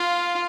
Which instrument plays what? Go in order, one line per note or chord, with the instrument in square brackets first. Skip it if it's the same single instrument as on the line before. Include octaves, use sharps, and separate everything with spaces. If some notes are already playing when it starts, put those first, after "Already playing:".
Already playing: [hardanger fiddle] F4 [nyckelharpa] F5